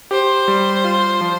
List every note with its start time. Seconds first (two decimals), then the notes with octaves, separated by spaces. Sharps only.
0.11 G4 C5
0.48 G3
0.84 F4
1.21 F3